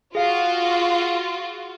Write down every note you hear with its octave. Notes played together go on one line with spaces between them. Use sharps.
F4 F#4 G#4 F5